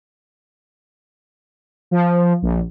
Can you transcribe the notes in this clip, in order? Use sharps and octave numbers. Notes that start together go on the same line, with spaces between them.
F3
A#1